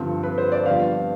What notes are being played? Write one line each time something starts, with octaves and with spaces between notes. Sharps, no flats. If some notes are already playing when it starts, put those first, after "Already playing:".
Already playing: G2 D3 F3 C4
B4
C5
D5
F2 D3 G3 B3 F5